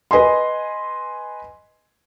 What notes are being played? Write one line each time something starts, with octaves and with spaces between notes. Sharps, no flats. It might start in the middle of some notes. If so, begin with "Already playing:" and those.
B4 D#5 G#5 C6